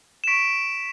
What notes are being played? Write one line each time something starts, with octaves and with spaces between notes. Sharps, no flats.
E7
C#6 B6 D7